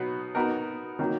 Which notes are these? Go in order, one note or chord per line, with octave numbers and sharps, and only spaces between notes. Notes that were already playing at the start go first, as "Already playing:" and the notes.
Already playing: B2 F#3 B3 D#4 F#4
B3 D#4 F#4 A#4
D#3 F#3 A#3 D#4 F#4